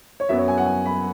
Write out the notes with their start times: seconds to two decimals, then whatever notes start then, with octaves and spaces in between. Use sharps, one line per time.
0.20 C#5
0.29 F#2 F#3 B3 E5
0.38 C#5
0.48 G#5
0.58 F#5
0.66 G#5
0.86 B5